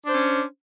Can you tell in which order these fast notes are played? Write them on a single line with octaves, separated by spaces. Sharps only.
D4 C5 C#4